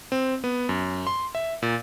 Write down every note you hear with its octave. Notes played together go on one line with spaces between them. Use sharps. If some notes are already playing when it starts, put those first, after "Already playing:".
C4
B3
F#2
C6
E5
A#2